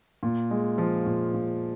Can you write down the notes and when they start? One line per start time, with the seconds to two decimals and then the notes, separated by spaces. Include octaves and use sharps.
0.23 A#2
0.50 G#3
0.78 F3
1.06 A#2
1.34 A#2